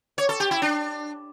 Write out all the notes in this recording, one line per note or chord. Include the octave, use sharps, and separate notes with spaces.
C#5
A4
G4
E4
D4